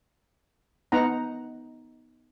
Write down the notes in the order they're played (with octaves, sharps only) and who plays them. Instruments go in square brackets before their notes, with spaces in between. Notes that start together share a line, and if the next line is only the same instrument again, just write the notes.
[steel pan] B3 D#4 F#5 A#5